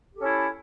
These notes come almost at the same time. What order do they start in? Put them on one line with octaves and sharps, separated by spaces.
G4 A4 C#4 E4